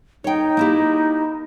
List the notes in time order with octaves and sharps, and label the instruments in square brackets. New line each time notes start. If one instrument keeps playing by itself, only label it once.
[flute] D#4 [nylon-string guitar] C#5 G5
[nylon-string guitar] A#3 E4 G4